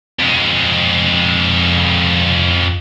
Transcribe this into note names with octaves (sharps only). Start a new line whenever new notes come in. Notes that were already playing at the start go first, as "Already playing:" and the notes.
F2 G#3